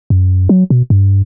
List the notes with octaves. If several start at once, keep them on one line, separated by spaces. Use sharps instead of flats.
F#2
F#3
B2
G2